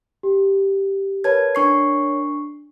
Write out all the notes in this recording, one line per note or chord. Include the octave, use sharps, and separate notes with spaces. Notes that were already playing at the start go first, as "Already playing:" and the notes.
G4
A#4 B4 C#5 A5 G#6
D4 C#6 C7